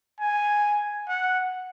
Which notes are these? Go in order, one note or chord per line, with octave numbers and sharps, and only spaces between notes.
G#5
F#5